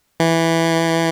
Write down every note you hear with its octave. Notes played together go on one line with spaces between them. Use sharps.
E3